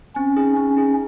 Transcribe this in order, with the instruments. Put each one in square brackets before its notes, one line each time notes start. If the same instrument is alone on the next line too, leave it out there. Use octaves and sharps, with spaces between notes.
[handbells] C4 [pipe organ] C#4
[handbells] D#4 G#4
[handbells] C4 [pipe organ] C#4
[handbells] D#4 G#4